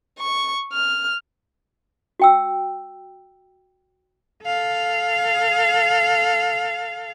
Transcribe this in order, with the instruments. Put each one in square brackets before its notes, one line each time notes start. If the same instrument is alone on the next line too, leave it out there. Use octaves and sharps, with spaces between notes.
[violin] C#6
F6
[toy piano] F#4 G5 E6
[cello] A4 F5